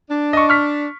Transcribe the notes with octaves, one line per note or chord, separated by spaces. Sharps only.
D4
D#5 C#6
C#6 F6 B6